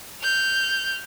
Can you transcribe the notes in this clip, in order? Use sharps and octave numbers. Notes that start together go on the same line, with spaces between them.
F6 G6